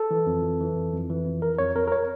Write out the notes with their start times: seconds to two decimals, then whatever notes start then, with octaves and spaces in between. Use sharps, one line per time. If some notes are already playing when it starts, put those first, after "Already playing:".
Already playing: A4
0.11 E3
0.26 F2
0.43 E3
0.60 E3
0.76 F2
0.93 F2
1.10 E3
1.26 F2
1.42 F2 A#4
1.58 F2 C#5
1.76 F2 A#4
1.87 A#4
1.92 C#5